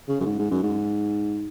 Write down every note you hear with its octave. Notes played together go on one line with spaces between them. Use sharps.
C#3
F#2
G#2
G#2
F#2
G#2